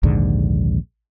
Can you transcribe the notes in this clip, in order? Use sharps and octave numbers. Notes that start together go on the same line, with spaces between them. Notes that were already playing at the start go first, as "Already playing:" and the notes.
A#1 D#2 G#2 D3